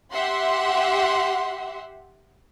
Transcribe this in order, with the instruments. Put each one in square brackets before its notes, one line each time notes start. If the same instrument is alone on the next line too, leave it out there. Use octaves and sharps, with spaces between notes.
[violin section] G4 E5 F#5 C6